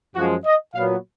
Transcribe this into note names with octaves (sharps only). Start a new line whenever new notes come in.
F#2 F3 G#3 F#4
D#5
A#2 F#3 B3 F5